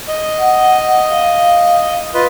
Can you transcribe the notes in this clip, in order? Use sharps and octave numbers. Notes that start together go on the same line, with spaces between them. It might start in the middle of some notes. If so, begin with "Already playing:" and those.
D#5
F#5
F5
F4 B4 D#5